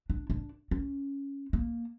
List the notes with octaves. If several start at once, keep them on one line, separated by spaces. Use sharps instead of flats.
D4
D4
C#4
A#3